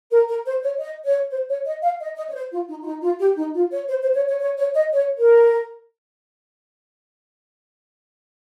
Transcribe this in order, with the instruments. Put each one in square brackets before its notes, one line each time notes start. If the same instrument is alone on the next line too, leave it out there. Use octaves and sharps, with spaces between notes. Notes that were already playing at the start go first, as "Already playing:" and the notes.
[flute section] A#4
A#4
C5
C#5
D#5
C#5
C5
C#5
D#5
F5
D#5
D#5
C#5
C5
F4
D#4
F4
D#4
F4
G4
D#4
F4
C#5
C5
C5
C#5
C#5
C#5
C#5
D#5
C#5
A#4